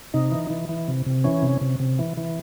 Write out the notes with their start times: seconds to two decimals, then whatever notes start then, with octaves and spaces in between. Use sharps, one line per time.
0.14 C3 D#4
0.31 E3
0.50 E3
0.69 E3
0.88 C3
1.06 C3
1.24 E3 C#4
1.43 C3
1.61 C3
1.80 C3
1.99 E3
2.17 E3